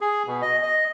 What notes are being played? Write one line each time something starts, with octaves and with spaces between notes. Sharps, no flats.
G#4
B2
D#5
D#5